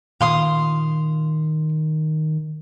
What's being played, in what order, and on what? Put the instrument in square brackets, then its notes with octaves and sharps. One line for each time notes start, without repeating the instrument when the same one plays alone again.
[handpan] A#2 [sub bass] D#3 [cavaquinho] F5 C6 D#6